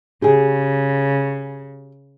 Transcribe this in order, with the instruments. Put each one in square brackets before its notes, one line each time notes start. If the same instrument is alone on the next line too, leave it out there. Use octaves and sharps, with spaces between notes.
[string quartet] C#3 [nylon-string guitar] G4 G#4